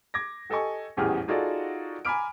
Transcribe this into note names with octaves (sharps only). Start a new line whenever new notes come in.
D6 G#6 A#6
G4 A4 D#5 G#5 C#6
D#1 A1 E2 G4 G#4 F6
D#4 F4 F#4 G#4 A4 D5
G#5 A#5 B5 D6 F6 D7